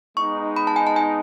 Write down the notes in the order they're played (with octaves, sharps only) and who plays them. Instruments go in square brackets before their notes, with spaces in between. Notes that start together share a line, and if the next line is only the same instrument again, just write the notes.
[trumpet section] G#3 B3 D#4 [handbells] C#6
[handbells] B5
A5
G#5
A5
G#5